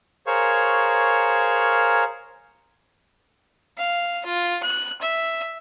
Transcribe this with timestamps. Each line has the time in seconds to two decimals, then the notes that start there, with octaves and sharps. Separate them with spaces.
0.27 G#4 A#4 C5 C#5 F5 C#6
3.78 F5
4.25 F4
4.63 F#6
5.01 E5